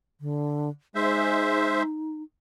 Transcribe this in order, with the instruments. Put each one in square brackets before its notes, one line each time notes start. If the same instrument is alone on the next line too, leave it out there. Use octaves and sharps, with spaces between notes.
[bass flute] D3
[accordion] G#3 C5 E5 [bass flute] D#4